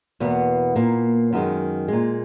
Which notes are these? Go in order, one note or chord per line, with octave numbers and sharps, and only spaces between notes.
E2 B2 A#3 B3
A#2 A#3
F#2 D#3 G#3
A#2 G#3